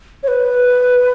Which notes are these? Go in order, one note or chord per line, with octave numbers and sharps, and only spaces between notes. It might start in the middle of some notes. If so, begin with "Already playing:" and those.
C#5
B4